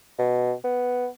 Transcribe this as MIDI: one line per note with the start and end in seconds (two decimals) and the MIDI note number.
0.19 0.54 47
0.64 1.08 59